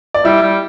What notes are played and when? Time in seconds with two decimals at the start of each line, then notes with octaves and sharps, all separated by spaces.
0.14 D5
0.25 G3 E4 E5
0.42 G3